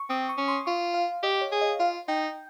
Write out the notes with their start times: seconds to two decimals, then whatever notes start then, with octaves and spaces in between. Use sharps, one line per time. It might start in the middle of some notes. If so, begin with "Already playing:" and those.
Already playing: C#6
0.10 C4 D#6
0.29 C#6
0.38 C#4
0.48 C6
0.66 F4 C#6
0.94 F5
1.23 G4 D#5
1.41 C#5
1.52 G#4
1.61 D#5
1.80 F4 F5
2.08 D#4 G5